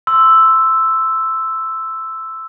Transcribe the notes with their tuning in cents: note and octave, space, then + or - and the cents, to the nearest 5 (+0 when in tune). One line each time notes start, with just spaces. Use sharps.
C6 +0 E6 +0